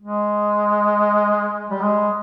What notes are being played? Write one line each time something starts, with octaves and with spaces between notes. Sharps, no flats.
G#3
G3
G#3